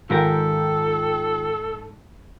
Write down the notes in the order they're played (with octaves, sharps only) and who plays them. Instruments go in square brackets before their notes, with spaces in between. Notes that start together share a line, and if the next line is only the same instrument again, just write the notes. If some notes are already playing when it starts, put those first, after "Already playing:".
[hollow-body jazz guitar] G#2 G4 A#4 [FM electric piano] D#3 F4 G5 [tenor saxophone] A4